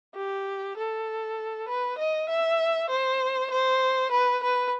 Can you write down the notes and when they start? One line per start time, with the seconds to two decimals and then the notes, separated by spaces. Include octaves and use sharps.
0.15 G4
0.77 A4
1.68 B4
1.98 D#5
2.29 E5
2.90 C5
3.51 C5
4.12 B4
4.43 B4